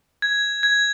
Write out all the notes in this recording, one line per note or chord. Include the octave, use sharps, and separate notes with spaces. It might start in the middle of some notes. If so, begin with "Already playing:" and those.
G#6
G#6